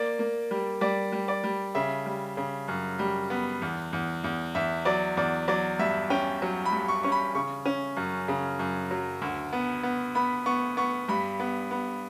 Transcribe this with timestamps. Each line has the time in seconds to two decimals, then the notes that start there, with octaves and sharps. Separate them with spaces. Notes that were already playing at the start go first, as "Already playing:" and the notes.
Already playing: A#3 D5
0.19 A#3
0.51 G3
0.81 G3 D5
1.12 G3
1.28 D5
1.44 G3
1.75 C#3 E5
2.06 G3
2.37 C#3
2.68 F#2
2.99 G3
3.30 B3
3.62 E2
3.93 E2
4.24 E2
4.55 E2 E5
4.85 F#3 D5
5.17 E2 D5
5.48 F#3 D5
5.79 G2 E5
6.10 C#4 G5
6.42 F#3
6.66 B5
6.73 G2
6.88 C#6
7.03 C#4 C#6
7.12 B5
7.35 C#3 C#6
7.65 C#4
7.97 F#2
8.28 C#3
8.59 F#2
8.91 F#3
9.21 D2
9.53 B3
9.83 B3
10.15 B3 B5
10.46 B3 C#6
10.77 B3 C#6
11.09 G2 B5
11.40 B3
11.71 B3